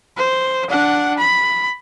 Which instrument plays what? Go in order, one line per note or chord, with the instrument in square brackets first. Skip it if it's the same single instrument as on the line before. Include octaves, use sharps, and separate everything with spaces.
[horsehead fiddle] C5
D4 F#5
B5